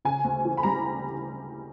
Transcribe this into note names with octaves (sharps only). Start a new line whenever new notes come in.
C#3 G#5
D2
E3
B5
G3 A#5